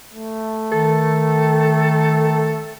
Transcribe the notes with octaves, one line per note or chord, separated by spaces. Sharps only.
A3
D#3 A4